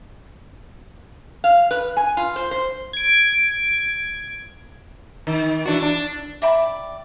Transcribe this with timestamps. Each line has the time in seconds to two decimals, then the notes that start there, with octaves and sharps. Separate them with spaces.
1.44 F5
1.71 B4
1.97 G#5
2.17 F4
2.36 C5
2.51 C5
2.93 G#6 D7
5.27 D#3
5.66 E3 D4 F#4
5.82 D4
6.42 D5 E5 G5 B5